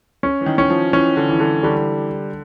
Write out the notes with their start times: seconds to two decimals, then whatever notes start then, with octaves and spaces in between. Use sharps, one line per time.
0.23 C#4
0.41 E3
0.46 D#3
0.58 C#4
0.70 F3
0.93 E3 C#4
1.17 D3
1.29 E3
1.40 D3
1.63 D3 G3